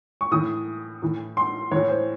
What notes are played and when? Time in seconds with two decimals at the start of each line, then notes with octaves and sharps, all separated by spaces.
0.21 C#6
0.31 A2 E3 D#6
1.02 A2 E3
1.37 C6
1.71 A2 E3 C#5
1.89 C5